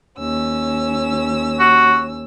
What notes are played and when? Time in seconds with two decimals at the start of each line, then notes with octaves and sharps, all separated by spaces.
0.18 D#2 C#4 E6
1.59 F#4